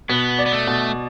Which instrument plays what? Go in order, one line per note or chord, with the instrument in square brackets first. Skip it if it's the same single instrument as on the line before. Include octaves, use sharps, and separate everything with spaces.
[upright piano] B2 [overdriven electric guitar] B3
[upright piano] D5
[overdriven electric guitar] B3
A3
[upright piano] B2